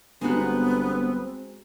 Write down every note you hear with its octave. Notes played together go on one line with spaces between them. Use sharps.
G1 G#3 B3 C4 D#4 F#4